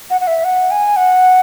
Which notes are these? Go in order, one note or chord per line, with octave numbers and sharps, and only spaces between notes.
F#5
F#5
E5
F#5
G#5
F#5